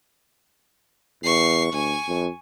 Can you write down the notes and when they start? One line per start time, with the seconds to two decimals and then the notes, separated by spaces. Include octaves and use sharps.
1.24 E2 C#6 C7
1.73 D2 G#5 C#6
2.08 F2